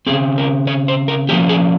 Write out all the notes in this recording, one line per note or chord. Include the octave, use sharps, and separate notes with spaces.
C#3 F3 C4 G#4
A#4
C#5
C5
A#4
F3 A#3 C#4 G4
G#4